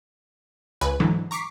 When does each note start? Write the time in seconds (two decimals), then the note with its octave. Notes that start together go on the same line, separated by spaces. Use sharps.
0.81 C#2 B4 G#5
1.00 G#2 D3 E3 F#3
1.31 A#5 C#6 D6 B6 C7